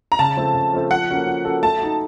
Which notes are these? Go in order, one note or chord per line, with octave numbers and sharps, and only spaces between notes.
A#5
C#3 A5
F3 A3 C4
C#3
F3 A3 C4
F3 F#5
A#3 C#4 F#4 A4
F3
A#3 C#4 F#4 A4
A3 A5
D#4 F#4